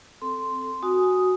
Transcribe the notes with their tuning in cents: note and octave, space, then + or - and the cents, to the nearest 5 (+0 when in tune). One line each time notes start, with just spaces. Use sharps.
C4 +0 A4 +0 C6 -5
F#4 +0 G#5 +0 D#6 +0